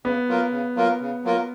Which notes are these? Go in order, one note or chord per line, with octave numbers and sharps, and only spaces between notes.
C#3 B3
F#3 A#3 F4 A#4
C#3
F#3 A#3 F4 A#4
C#3
F#3 A#3 F4 A#4